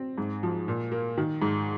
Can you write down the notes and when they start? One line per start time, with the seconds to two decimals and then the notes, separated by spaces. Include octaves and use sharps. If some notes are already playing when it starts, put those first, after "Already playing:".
Already playing: C4
0.18 G#2
0.43 F3
0.68 A#2
0.92 A#3
1.18 D#3
1.42 G#2